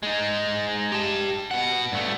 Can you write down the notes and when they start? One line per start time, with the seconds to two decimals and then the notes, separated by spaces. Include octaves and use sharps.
0.03 G#3 D#4
0.92 G4 A5
1.51 B2 F#5
1.92 G2 A3